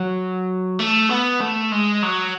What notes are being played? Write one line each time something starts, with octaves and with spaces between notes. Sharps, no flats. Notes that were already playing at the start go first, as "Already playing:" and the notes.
Already playing: F#3
A3
B3
A3
G#3
F#3